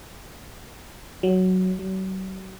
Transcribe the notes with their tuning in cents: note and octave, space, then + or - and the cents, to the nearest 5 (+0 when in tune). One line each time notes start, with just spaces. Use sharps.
F#3 +5
F#3 +40